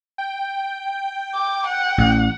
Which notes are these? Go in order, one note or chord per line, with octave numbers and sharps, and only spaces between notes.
G5
D6
F#5
A1